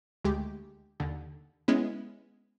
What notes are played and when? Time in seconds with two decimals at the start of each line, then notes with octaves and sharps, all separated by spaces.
0.24 D2 G#3 G4
1.00 D#2 D3
1.68 G#3 B3 C#4 E4